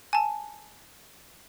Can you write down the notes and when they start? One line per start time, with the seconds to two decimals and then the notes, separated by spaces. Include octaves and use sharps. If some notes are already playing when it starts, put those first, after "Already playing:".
0.13 G#5 A5